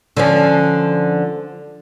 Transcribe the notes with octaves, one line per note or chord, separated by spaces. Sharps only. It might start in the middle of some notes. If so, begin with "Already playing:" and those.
D3 F3 C#4